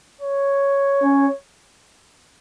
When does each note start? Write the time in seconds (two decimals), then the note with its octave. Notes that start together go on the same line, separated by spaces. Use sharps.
0.21 C#5
1.03 C#4